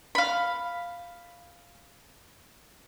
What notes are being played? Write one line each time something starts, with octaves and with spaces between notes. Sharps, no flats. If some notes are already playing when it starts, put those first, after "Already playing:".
F5 B5